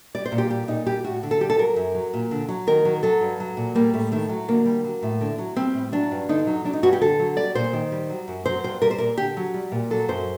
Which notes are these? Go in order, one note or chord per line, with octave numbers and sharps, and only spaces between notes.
G3 D5
C5
A#2
G4
G3 G4
A#2 D#4
G3 G4
A2 F#4
D3
A4
G3 G4
A4
F#3 A#4
F#2
F#3
A#2
D3
F#3
D#3 A#4
F#3
F#3 A4
G2
F#3
A#2
G3 A#3
A2 A3
D#3 A3
F#3
D3 A#3
G3
F#3
A2
D3
F#3
G3 C4
A2
F#3 D4
G2
D3 D#4
F#3
F#3 D4
D#4
G2 F#4
G4
D3 A4
F#3
G3 D5
A#2 C5
D#3
G3
F#3
F#2
F#3 C5
G2 C5
G3 A#4
C5
A#2 A#4
D3 G4
F#3
G3
A#2
F#3 A4
F#2 C5